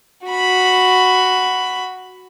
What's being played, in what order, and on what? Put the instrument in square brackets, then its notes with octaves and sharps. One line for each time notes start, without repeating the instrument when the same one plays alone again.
[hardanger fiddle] F#4 B5